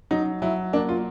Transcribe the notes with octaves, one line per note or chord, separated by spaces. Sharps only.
F#3 D#4
F#3 E4
A#3 D4
F4